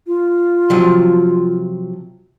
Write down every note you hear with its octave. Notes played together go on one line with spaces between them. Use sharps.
F4
C3 F3 F#3